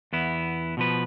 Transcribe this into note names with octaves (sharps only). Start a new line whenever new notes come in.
E2 B3 E4
B2 F3 B4